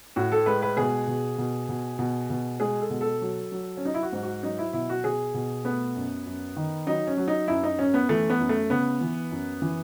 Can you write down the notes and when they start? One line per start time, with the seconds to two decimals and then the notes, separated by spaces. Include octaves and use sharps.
0.16 A2 F#4
0.32 A4
0.46 G#3 B4
0.62 B4
0.77 B2 G#4
1.07 B2
1.38 B2
1.69 B2
1.99 B2
2.30 B2
2.60 G#3 G#4
2.80 A4
2.90 B2
3.01 A4
3.21 F#3
3.52 F#3
3.77 C#4
3.82 F#3 D#4
3.94 E4
4.03 F#4
4.13 G#2
4.23 F#4
4.43 F#3 D#4
4.58 E4
4.73 B2 E4
4.89 F#4
5.04 B2 G#4
5.34 B2
5.64 A3 B3
5.96 F#2
6.26 F#2
6.57 D#3
6.87 F#3 D#4
7.07 C#4
7.17 F#3
7.28 D#4
7.48 F#2 E4
7.63 D#4
7.79 F#2 C#4
7.94 B3
8.09 E3 A3
8.30 B3
8.39 F#2
8.49 A3
8.70 C#3 B3
9.01 E3
9.31 F#2
9.62 E3